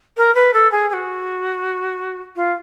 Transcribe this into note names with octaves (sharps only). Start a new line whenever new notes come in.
A#4
B4
A4
G#4
G#4
F#4
F4